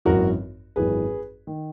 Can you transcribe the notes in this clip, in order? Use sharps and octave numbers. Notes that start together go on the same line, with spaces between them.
G#1 F#2 E3 F#4 A#4
G#1 F#2 E3 G#4 B4
D#3